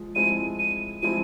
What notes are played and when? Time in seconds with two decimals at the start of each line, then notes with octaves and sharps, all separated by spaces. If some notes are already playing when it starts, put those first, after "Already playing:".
Already playing: F3 G#3
0.15 F3 G#3 C4 E4 D#7
0.59 D#7
1.02 F3 G#3 C4 E4 D#7